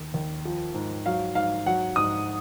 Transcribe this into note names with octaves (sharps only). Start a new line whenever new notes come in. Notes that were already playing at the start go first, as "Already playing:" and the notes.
Already playing: D#2
D#2
F3
G#2
F#3 F5
G#2 F5
F#3 F#5
G#2 D#6